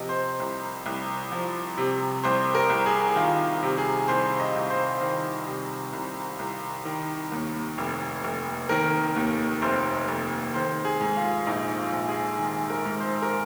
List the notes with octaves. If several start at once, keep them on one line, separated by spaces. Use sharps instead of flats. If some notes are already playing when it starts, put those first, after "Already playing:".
Already playing: C3 F3 D#5
C5
C2
C2
F3
C3
C2 C5
A#4
C2
G#4
D#3 F4
C3
G#4
C2 C5
D#5
C2
C5
D#3 C5
C3
C2
C2
D#3
D#2
F1
F1
D#3 A#4
D#2
F1 C5
F1
D#3 C5
G#4
G#2
F4
A#1 D#4
F4
A#1
G#4
D#3
A#4
G#2
C5
A#4